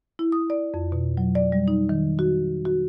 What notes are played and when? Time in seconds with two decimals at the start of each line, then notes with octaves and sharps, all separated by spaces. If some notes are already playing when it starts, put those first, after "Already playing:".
0.19 E4
0.32 D#6
0.50 D5
0.74 F2
0.92 B2
1.17 F#3
1.35 D5
1.52 G3
1.68 D#4
1.89 D#3
2.19 F#4
2.65 F#4